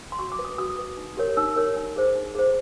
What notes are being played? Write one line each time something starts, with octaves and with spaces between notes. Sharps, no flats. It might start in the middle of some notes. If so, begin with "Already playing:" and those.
C6
F#4 C#6
D6
B4
D#6
F#4 D#6
B4
D#4
G4 A#4 C#5
D#4 E6
G4 A#4 C#5
D#4
G#4 C5
D#4
G#4 C5